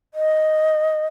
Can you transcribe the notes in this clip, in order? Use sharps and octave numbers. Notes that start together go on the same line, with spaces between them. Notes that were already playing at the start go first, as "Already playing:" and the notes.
D#5